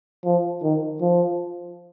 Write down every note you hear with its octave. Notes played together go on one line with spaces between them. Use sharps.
F3
D#3
F3